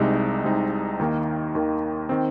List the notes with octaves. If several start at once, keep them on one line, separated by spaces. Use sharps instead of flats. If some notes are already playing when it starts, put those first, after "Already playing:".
Already playing: C2 C3 G#3 D#4
C2 C3 G#3 D#4
D#2 D#3 A#3
D#2 D#3 A#3
D#3 C4